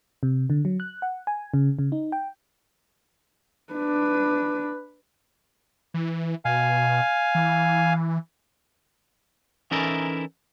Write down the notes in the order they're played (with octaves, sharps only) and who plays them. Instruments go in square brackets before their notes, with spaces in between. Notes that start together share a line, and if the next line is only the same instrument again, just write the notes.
[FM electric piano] C3
D3
F#3
F#6
F#5
G#5
C#3
C#3
D#4
G5
[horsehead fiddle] D4 B4
[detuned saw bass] E3
[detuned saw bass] B2 [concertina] F5 G#5
[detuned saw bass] E3
[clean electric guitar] E3 C#4 D#4 E4 A4 A#4